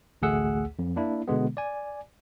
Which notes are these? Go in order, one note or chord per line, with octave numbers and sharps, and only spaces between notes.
A1 D2 A3 G#4 F#5 E6
F2
A#3 D4 E4
B2 D3 G#3 B3
D5 G#5